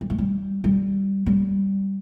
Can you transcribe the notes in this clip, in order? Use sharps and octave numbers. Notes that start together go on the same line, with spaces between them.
G3
G#3
G3
G3
G3